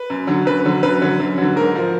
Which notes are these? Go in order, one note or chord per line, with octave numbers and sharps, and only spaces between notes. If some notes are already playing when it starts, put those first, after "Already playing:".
Already playing: B4
F#2
D3 F#3
F#2 B4
D3 F#3
F#2 B4
D3 F#3
F#2
D3 F#3
G#2 A#4
F3